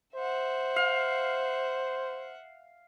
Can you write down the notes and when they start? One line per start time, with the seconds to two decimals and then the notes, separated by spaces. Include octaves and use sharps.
0.15 C5 E5 F#5
0.76 F5